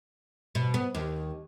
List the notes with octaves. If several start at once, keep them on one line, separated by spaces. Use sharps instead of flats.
B2
B3
D#2